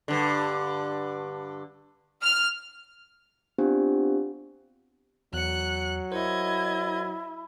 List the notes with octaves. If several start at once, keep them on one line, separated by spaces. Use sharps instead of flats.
G2 D3
F6
B3 C4 D4 F4 G4 C5
E2 F#3 F#6 C#7
E4 A#4 C5 D#5 G#6